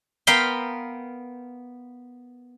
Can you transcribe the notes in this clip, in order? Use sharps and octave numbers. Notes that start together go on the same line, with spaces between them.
B3 A#4 F5 G5 B5 C6